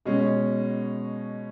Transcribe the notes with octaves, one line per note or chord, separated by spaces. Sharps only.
B2 G#3 C#4